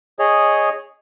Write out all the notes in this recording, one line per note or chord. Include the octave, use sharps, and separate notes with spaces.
G#4 C#5 D#5